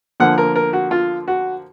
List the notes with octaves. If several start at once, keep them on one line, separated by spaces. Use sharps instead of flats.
D3 F3 A#3 F#5
A#4
A#4
F#4
F4
F#4